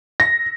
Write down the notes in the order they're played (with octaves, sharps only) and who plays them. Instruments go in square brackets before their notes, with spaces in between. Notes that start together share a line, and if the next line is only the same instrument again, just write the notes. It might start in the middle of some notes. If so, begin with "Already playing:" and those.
[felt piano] A#6